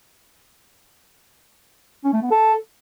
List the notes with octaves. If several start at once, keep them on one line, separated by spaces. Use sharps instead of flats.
C#4
A3
B3
A4